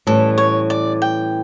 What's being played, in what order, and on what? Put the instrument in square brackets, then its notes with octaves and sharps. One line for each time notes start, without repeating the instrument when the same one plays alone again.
[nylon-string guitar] A2 E3 G3 C#4 [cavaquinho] A4
[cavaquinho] C#5
D5
G5